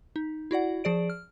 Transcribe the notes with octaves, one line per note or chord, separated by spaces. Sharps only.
D#4
E4 F#4 D5 F#5
F3 G#4 D5 D7
F6